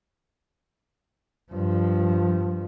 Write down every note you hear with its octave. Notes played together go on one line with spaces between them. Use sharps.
G2 F3